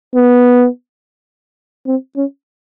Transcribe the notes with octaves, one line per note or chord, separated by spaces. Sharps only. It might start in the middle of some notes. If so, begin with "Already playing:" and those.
B3
C4
C#4